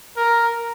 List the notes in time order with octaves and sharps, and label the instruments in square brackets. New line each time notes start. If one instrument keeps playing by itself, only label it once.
[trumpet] A#4